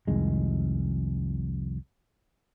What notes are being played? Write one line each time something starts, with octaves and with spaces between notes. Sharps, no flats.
C2 F2 D#3 G#3